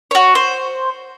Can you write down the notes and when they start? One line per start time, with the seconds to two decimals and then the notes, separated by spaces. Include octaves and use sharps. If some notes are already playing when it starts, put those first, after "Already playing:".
0.11 F#4 C#5
0.35 C5